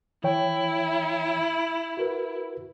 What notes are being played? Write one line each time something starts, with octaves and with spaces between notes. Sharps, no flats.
E3 E4 C#5 G5
F#4 A#4 B4